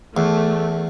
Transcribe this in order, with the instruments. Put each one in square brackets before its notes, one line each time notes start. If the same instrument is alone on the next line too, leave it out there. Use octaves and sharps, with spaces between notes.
[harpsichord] E2 [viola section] A3